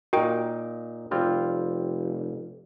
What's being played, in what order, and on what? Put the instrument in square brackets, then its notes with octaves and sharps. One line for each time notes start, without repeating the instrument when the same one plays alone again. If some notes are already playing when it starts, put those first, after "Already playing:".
[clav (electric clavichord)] A#2 D#4 [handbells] F#4 A#4 G5
[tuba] F1 [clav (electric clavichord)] G3 C4 F4